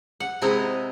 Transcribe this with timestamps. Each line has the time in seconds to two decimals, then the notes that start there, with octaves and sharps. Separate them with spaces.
0.20 F#5
0.42 C3 G#3 E4 D#5 A#5